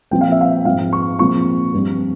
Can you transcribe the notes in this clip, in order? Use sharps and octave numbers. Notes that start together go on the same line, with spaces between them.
A#2 F3 C4 G5
F5
E5
F5
G#2 F3 C4 F5
C#6
A#2 F3 G#3 C4 C#6
G2 F3 C4